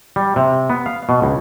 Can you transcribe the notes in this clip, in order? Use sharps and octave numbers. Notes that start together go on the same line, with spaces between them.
G3
C3
B3
F5
B2
C#2